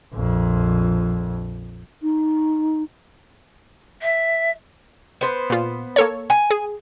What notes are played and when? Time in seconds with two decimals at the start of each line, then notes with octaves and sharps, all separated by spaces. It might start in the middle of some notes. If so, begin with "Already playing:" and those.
0.13 A#1 F2
2.01 D#4
4.02 E5
5.21 B3 C5
5.50 A#2 F4
5.96 A#3 A4 C#5
6.30 G#5
6.51 G#4